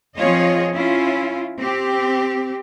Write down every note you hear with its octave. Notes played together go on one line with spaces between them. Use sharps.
F3 C4 F4 G#4 C#5 D#5
C#4 E4 F4
C4 G4